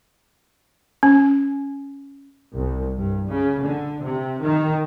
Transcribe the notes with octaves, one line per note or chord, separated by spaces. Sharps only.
C#4
C2
G2
C#3
D3
C3
D#3